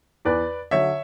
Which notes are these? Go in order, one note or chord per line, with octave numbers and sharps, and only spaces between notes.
E2 B4 D5
D3 F#3 C#5 E5